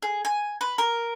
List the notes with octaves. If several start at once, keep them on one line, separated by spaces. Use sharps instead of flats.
G#4
G#5
B4
A#4